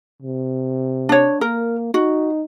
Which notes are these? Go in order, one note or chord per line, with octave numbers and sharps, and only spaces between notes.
C3
D4 C#5
A#3 A#4
D#4 F#4